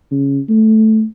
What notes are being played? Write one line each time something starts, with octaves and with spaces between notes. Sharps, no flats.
C#3
A3